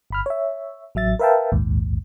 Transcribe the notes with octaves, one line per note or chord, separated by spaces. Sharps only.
G1 B5 F6
C#5 E5
A1 F#3 E5 A6
A#4 B4 E5 F5 G5 A5
A#1 D#2 G#2